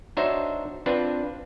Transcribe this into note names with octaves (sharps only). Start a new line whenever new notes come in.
D4 D#4 F#4 C5 C#5 E5
C4 D4 F4 B4